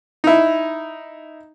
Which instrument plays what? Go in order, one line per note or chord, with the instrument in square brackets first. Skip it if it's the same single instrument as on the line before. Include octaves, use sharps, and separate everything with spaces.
[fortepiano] D#4 E4